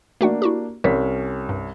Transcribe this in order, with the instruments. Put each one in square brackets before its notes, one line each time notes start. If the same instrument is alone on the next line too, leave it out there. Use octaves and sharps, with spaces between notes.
[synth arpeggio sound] A3 F#4 F#5 [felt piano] A#3 D4
[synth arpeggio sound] E4 F#4 G4
[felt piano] C2 C#4 B6 [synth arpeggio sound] G3
[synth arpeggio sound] G2